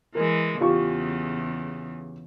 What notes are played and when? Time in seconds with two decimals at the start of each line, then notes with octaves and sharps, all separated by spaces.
0.15 E3 G#3 A#4
0.61 E2 C#3 F4 G4 C#6